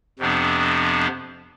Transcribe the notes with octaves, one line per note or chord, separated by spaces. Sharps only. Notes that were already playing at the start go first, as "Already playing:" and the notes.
F2 C3 F3 B3 D4